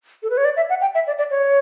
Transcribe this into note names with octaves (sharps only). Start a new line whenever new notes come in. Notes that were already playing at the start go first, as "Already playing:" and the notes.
A4
B4
C#5
D5
E5
F#5
G5
E5
D5
D5
C#5